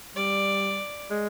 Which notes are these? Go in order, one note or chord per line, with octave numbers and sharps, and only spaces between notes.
G3 D5
G#3